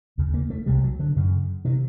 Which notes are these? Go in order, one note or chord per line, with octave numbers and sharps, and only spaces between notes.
D#2 C#3
A#3
A3
C2 C3 G3
F#3
D3
F#2 C#3
C3 D#3